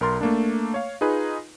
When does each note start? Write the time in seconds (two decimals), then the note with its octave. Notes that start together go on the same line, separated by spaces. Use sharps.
0.01 B1 A#4 C6 A6
0.21 A3 A#3 D4
0.74 C#5 F5
1.01 D#4 F4 G#4 B4